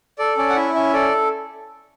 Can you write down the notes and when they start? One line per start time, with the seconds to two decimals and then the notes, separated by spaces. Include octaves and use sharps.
0.19 A4 D5
0.37 C#4 D5
0.50 F#5
0.56 E4 E5
0.75 C#4 E5
0.93 A4 D5